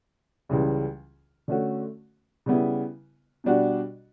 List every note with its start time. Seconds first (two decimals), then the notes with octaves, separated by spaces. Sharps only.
0.49 C#2 C#3 E3 G3
1.48 D3 A3 C#4 F#4
2.46 C#3 G3 B3 E4
3.44 B2 G3 D4 F#4